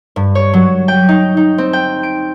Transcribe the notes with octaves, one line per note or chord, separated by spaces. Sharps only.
G2
C#5
F#3
G5
D#4
D#4
C4
G5
D7